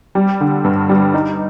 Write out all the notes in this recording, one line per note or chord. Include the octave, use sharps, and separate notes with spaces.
G3
D3
G2
G3
D#4